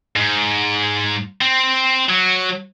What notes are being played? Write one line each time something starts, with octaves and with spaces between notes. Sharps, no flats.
G#2
C4
F#3